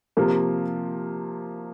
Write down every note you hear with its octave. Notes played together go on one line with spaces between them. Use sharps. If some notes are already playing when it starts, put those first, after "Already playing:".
C3 F3 A#3